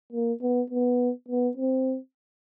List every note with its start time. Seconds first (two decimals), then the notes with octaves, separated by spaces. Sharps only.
0.13 A#3
0.41 B3
0.70 B3
1.28 B3
1.57 C4